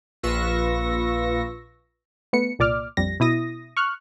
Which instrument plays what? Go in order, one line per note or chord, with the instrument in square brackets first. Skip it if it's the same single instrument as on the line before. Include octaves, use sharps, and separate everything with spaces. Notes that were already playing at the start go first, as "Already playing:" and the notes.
[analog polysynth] A#1 F4 B4 C#6 E6 A#6
[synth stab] A3 B3 B4 C#7
C2 A#2 D5 D6 F6
A#1 F2 G3 A#6
B2 E4 D#6 A#6
C#6 F6 F#6